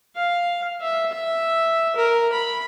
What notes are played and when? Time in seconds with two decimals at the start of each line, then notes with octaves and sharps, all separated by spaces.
0.16 F5
0.82 E5
1.13 E5
1.96 A#4
2.32 B5